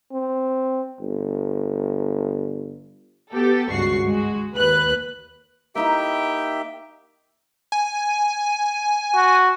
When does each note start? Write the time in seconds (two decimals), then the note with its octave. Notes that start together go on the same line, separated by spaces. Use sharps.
0.13 C4
1.01 G1
3.31 B3 G4 A4
3.71 G#1 C#2 G2 F#4 C#6 C7
4.06 G#3 F#4
4.54 D#2 B4 F#6
5.75 A#3 D#4 E4 G4 E5 G5
7.72 G#5
9.15 F#4